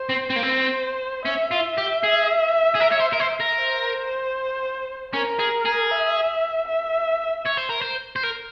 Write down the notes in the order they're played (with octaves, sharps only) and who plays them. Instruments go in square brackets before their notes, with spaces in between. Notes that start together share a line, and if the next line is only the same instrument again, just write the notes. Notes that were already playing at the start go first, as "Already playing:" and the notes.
Already playing: [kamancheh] C5
[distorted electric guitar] C4
C4
A#3
C4
[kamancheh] C5
[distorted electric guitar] C#4 [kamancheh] E5
[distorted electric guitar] F4
G4
G#4
G#4
A#4
C#5
C5
A#4
C5
A#4
[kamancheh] C5
[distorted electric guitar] C#4 [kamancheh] A#4
[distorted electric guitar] G#4
G#4
[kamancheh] E5
E5
[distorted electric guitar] C#5
C5
A#4
C5
C5
A#4